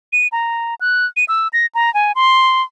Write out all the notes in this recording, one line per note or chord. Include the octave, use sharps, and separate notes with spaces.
D#7
A#5
F#6
D#7
E6
A#6
A#5
G#5
C6